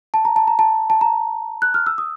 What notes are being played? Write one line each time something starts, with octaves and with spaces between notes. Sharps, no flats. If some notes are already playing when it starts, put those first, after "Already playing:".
A5
A#5
A5
A#5
A5
A5
A#5
F#6
F6
E6
D#6